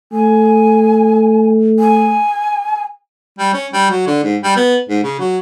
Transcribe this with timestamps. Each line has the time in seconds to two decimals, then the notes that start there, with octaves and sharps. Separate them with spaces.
0.13 A3 G#5
1.79 G#5
3.39 G3
3.54 C#4
3.73 G3
3.91 F#3
4.07 D3
4.23 G#2
4.43 G3
4.57 B3
4.89 G#2
5.04 C#3
5.19 F#3